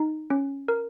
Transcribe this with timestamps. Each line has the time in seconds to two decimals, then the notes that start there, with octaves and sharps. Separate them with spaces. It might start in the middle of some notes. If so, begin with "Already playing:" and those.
Already playing: D#4
0.30 C#4
0.68 A#4